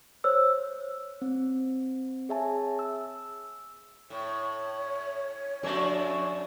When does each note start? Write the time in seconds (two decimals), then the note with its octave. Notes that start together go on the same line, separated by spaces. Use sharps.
0.24 C5 C#5 E6
1.22 C4
2.29 G#4 C#5 E5 G#5 A5
2.79 E6
4.10 A2 C#5
5.63 F2 A3 D4 D5